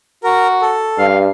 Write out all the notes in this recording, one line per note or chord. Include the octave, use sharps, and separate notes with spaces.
F#4 A#4
A4
G2 F5